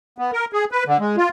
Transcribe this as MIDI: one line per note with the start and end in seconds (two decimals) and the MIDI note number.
0.18 0.31 59
0.33 0.45 70
0.53 0.65 68
0.72 0.84 71
0.86 0.97 50
1.00 1.16 56
1.17 1.29 65